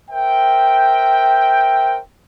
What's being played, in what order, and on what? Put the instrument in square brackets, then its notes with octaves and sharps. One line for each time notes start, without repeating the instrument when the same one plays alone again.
[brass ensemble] A#4 C5 E5 G5